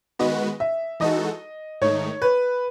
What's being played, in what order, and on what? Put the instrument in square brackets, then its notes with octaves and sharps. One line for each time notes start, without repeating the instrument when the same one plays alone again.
[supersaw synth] D#3 G#3 B3 F#4 B4 [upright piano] D#5
[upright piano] E5
[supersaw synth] E3 G#3 D#4 F#4 A4 [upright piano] D#5
[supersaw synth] G#2 D#3 A3 D#4 [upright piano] C#5
[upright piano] B4